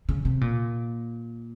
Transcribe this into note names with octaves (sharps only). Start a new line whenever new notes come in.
C#3
C3
A#2